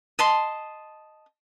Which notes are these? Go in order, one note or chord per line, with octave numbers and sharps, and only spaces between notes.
D#5 A5 C6